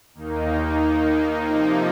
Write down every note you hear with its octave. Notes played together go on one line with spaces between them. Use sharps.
D#2 D#3 A#3 D#4
C3 F3 A#3 D#4